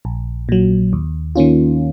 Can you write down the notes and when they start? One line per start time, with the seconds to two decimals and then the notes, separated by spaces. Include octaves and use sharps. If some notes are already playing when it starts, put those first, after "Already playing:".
0.05 A#1
0.49 A#2 F#3
0.93 D#2
1.36 D#3 A#3 C#4 F4